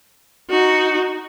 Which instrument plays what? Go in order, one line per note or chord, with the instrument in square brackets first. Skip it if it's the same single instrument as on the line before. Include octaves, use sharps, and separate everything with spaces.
[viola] D#4 F#4